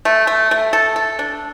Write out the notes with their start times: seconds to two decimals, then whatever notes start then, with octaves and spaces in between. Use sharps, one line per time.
0.05 A3
0.27 A3
0.51 A3
0.73 A4
0.96 A4
1.19 D4